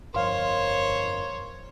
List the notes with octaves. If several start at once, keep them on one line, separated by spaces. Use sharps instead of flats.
G1 F2 A#4 C5 C#5 F5 C6